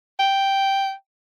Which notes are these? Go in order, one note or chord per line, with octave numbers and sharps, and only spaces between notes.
G5